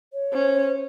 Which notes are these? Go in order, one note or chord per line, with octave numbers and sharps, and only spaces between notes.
C#5
C#4 C5